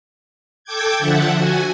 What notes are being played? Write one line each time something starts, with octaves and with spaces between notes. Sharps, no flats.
A4 G5 D6 G6 G#6
D3 F3 E5 F#5 A5
F#4 G#5